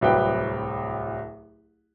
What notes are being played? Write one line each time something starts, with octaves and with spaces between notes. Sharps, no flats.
D1 C2 F#3 B4 G5